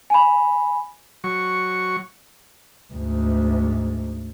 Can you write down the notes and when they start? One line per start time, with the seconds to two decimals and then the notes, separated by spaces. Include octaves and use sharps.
0.10 G#5 B5
1.24 F#3 C#6
2.93 D2 G#2